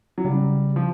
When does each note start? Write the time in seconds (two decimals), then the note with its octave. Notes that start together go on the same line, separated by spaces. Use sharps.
0.18 F#3
0.25 C#3 G3
0.76 F3